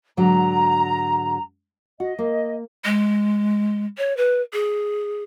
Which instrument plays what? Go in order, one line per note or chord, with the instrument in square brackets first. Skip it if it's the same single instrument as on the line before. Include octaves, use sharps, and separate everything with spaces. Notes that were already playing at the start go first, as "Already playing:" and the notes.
[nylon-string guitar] G#2 D3 F#3 [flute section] A#5
[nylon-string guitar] F#4 [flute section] D#5
[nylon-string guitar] A#3
[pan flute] G#3
C#5
B4
G#4